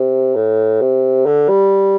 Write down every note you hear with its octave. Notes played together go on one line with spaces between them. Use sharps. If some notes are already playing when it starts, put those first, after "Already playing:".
Already playing: C3
A2
C3
D3
G3